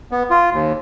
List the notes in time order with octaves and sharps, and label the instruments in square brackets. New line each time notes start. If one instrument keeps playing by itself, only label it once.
[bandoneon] B3
F4
D#2